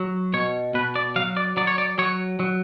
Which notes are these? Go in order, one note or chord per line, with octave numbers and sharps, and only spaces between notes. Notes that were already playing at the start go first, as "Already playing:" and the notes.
Already playing: F#3
B2 C#5
B2 B4
D5
F#3 F5
D5
F#3 D5
C#5
D5
F#3 C#5
F#3